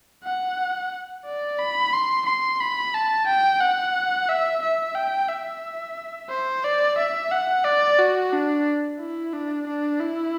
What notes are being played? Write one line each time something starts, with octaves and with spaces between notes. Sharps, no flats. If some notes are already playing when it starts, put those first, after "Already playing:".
F#5
D5
B5
C6
C6
B5
A5
G5
F#5
E5
E5
G5
E5
C5
D5
E5
F#5
D5
F#4
D4
E4
D4
D4
E4